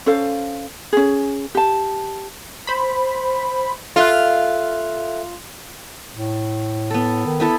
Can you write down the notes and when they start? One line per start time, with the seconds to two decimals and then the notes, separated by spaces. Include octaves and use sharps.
0.06 C#4 A4 C5 F5
0.93 C#4 G#4
1.55 G4 A5
2.67 C5 B5
3.96 F4 A4 E5 F#6
6.15 A2
6.90 B3 A4
7.26 D#3
7.40 B3 E4 A4